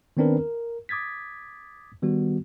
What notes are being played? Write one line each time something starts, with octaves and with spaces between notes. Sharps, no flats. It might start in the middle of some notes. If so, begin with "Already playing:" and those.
D#3 B3 C4 D4 A#4 B4
A#4
D6 D#6 G#6 A6 B6
D#3 G3 B3 F#4